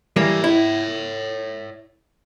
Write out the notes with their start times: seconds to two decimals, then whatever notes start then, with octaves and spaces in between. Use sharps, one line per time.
0.16 E3 G3 A#3 C#5 E5
0.44 E4